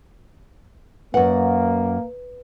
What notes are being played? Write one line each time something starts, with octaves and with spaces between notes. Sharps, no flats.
F#2 A#3 B4 F#5